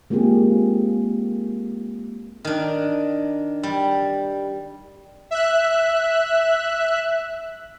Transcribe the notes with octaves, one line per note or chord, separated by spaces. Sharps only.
G#3 A#3 C4 F4 G4 G#4
D#3 D4
G3
E5 F#6